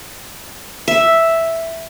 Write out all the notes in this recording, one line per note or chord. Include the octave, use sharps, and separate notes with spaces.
E5